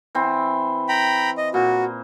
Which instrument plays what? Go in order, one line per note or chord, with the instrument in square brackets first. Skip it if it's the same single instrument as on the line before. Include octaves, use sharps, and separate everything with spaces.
[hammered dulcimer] E3 C4
[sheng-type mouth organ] G5 A#5 B5
D#5
[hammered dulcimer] A#2 [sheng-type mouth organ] F#4